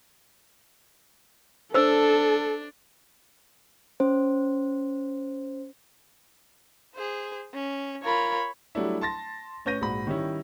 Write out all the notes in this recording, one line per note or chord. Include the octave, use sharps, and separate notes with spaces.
D4 A4 C5 E6
C#4 C5
G#4 C5
C#4
F4 A#4 C#5 B5
F#3 G3 A3 D4 E4
A5 C6 A6 A#6
A2 C#4 B4 G6 A#6 D#7
A#1 G#2 F#4 B5
D#3 G3 C#4 E4